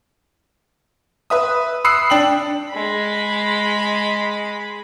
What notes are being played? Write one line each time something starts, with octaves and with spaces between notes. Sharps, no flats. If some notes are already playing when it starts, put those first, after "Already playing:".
B4 E5 D#6
B5 D#6 E6 F#6 C7 C#7
D4 G5 F#7
G#3 B5